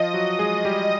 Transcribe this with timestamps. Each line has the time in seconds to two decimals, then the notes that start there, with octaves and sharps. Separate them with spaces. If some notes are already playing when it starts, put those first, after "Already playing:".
Already playing: F3 F4 D#5
0.14 F#3 F#4
0.39 G#3 G#4
0.65 G3 G4